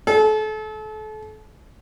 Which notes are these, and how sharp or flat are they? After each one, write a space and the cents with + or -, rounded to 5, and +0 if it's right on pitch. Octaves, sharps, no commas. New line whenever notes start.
A4 -35